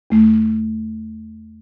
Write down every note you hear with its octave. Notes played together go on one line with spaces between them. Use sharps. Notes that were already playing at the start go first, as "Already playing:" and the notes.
E2 A3